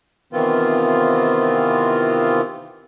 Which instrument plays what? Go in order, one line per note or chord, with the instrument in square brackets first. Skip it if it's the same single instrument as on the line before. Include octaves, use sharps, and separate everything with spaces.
[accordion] C3 D#3 E3 B3 C4 F4